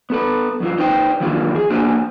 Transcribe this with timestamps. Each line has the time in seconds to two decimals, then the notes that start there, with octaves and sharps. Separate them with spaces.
0.10 B3 A4 B4
0.60 F#2 E3 F4
0.78 D#4 B4 C5 G5
1.20 D#3 E3 F#3 A#3 D4 F4
1.55 G#4
1.70 A#3 B3 D4 F#4 C5 G#5